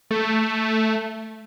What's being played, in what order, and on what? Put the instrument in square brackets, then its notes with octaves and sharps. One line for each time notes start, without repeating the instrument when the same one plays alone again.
[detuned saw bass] A3